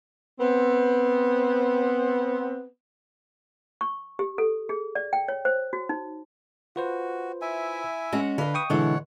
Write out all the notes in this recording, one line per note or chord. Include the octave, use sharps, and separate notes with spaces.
B3 C4
C#6
G4
A4
G#4
D5
G5
C#5
C5
F#4
D#4
F4 F#4 B4 C5
E4 E5 G#5
G#3 C#4 F#4
D3 D4 B4 D#5 F5
G5 C#6 D#6
B2 D3 E3 G#3 E4 C#5 F#5